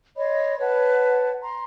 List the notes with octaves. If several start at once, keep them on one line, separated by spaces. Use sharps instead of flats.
C#5 D#5 B5 C6
B4 C#5 F#5 A5
A#5 C6